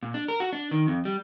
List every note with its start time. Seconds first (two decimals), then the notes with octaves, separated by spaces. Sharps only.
0.03 A#2
0.14 D4
0.28 A#4
0.40 F#4
0.53 D4
0.71 D#3
0.87 F2
1.05 G3